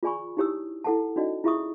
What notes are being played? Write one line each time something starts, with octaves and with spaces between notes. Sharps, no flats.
F4 G#4 D5 G#5 B5 C#6
D#4 E4 G4 C#5 D#6 E6
E4 A4 F#5 A5
C#4 D#4 F#4 D5 D#5
E4 F4 G#4 E5 C#6 D#6